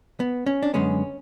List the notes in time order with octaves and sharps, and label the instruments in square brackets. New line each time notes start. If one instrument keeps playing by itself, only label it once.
[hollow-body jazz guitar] B3
C#4
D4
F#2 D3 G#3 B3 C#4